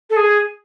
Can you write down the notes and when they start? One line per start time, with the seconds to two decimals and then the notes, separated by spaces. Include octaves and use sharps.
0.09 A4
0.16 G#4